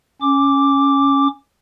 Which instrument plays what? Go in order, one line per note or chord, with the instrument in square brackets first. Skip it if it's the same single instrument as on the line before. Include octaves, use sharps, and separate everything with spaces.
[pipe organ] C#4 D6